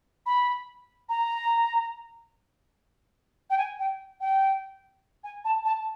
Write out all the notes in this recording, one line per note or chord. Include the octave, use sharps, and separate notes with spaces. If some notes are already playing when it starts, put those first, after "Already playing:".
B5
A#5
G5
G#5
G5
G5
G#5
A5
A5